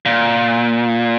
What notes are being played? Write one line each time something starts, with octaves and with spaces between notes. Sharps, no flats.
A#2